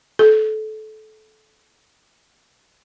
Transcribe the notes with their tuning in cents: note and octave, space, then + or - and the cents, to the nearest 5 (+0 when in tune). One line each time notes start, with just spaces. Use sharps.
A4 -25